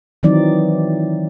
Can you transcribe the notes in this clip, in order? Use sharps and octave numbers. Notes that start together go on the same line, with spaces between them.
D#3 E3 F#3 C4 D#4 D5